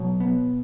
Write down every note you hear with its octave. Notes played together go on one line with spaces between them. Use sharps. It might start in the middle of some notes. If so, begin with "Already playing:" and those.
Already playing: B2 F#3 C#5
B3